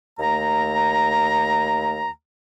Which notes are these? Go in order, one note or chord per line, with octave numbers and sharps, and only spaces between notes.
D#2 A3 A#5